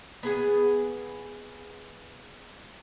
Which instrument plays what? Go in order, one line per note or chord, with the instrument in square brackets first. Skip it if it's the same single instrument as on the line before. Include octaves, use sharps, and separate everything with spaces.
[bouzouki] B3 G#4 F#5